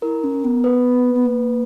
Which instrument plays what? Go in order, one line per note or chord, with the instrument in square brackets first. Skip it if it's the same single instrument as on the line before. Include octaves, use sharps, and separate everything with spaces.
[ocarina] E4 [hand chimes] A#4
[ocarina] C#4
B3
[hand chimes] B4
[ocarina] B3
A#3